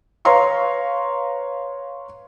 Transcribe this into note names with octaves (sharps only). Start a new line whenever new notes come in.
B4 C#5 F5 A#5 C6 C#6